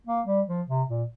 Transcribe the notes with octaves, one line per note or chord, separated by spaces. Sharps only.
A#3
G3
F3
C3
A#2